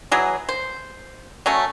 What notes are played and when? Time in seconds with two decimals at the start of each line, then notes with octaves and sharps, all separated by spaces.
0.11 E3 F#3 G#4
0.49 C5
1.46 F#3 A3 C#4